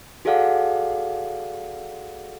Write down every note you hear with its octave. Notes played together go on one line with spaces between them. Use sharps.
F#4 G#4 A4 D5 F5 F#5